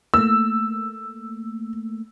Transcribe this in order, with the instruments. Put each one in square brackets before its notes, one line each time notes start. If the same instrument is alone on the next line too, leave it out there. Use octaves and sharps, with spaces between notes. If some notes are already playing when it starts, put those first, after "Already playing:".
[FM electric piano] A3 A#3 [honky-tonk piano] E6